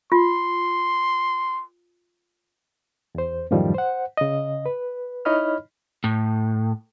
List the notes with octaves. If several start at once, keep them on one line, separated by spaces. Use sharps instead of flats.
F4 C6
E2 C5
F#2 A2 D#3 F3 G3
C5 F#5
C#3 D#5
B4
D#4 E4 C#5 D#5 B5 F6
A2